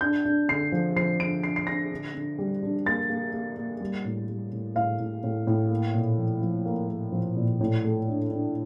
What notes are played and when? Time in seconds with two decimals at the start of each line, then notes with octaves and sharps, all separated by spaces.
0.01 D4 G6
0.25 D4
0.49 D3 C7
0.72 F3
0.96 F3 C7
1.20 D3 D7
1.43 D4 C7
1.56 C7
1.67 D4 A#6
1.91 D3
2.14 D3
2.38 G3
2.63 D4
2.86 A#3 A6
3.09 A#3
3.33 A#3
3.57 A#3
3.80 G3
4.05 A2
4.29 G3
4.53 A2
4.75 A2 F5
4.99 A2
5.24 A2
5.47 A2
5.70 A#3
5.94 A#2
6.18 F3
6.41 F3
6.65 A#3
6.89 A#3
7.12 F3
7.36 A#2
7.61 A2
7.84 A3
8.08 D4
8.31 D4